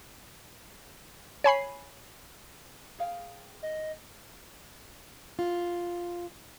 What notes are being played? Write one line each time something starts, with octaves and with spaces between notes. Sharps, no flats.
C#5 G#5 B5 C7
G#4 F5 G5
D#5
F4